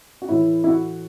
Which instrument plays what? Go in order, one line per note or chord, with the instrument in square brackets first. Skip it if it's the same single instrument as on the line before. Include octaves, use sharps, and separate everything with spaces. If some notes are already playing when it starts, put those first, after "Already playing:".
[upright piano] F#4
A2 E3 E4
E4
F#4